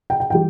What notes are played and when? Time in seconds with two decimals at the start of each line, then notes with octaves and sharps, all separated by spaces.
0.10 G5
0.20 G5
0.30 E3 G3 G5